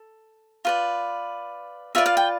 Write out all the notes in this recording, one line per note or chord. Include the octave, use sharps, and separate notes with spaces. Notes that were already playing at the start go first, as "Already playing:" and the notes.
Already playing: A4
F4 B4 D5
F4 B4 D5 E5
F5
G5